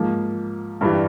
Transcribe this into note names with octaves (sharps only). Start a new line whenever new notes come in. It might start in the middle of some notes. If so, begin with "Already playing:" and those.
Already playing: G#2 F3 A#3
G2 E3 G3